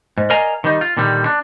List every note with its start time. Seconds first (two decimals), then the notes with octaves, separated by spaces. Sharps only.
0.18 G#2
0.30 A#4 D5 D#5 F5 G#5 A#5
0.64 D#3 G3 D#4
0.81 F4
0.97 A#2 D3 D#3 G3
1.26 D4